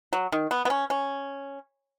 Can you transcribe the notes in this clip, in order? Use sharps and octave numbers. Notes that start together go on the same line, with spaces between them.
F#3
D#3
B3
B3
C#4
C#4